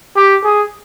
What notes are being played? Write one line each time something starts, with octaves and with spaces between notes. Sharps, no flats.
G4
G#4